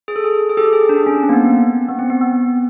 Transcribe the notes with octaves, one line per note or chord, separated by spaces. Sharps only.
G#4
A4
G#4
G#4
G4 A4
G#4
D4
C#4
C4
A#3
B3
B3
B3
C4
B3
B3